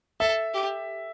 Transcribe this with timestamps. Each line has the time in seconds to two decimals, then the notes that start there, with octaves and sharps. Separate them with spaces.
0.20 A4 E5
0.54 G4